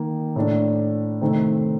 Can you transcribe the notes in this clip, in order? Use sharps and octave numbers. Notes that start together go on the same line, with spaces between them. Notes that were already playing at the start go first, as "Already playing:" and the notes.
Already playing: D#3 A#3
A2 A3 D4
C3 D#3 A3 C4